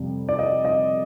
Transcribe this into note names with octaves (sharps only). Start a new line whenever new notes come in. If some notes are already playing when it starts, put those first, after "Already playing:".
Already playing: F2 C3 G3
D5
D#5
D#5